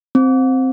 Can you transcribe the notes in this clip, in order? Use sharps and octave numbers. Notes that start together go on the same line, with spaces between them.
C4